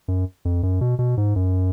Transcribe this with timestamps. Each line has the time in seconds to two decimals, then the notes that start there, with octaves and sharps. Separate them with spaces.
0.08 F#2
0.45 F2
0.63 F#2
0.81 B2
0.99 B2
1.17 G#2
1.36 F#2